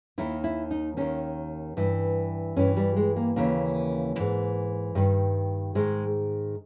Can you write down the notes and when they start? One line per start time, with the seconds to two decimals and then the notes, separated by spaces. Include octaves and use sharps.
0.18 D#2 D#3 E4
0.44 E4
0.71 D#4
0.97 D#2 D#3 C#4
1.77 G2 E3
2.56 G2 E3 C#4
2.77 G3
2.96 G#3
3.16 A#3
3.36 D#2 C#3 E3 A#3
4.16 G#2 E3
4.95 G2 D#3
5.75 G#2 D#3 G#3